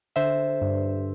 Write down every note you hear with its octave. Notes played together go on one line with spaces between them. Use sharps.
D3 C5 E5
G2